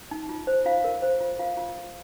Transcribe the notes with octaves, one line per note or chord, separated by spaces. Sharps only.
D#4
F4
C5
F4 F5
A#4
C5
F4
F4 F5
F4
F4